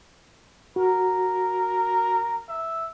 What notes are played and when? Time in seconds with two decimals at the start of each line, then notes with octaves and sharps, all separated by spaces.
0.76 F#4 A#4
2.49 E5